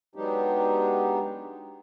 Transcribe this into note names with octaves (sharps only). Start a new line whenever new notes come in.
F#3 G#3 B3 D4 D#4 G4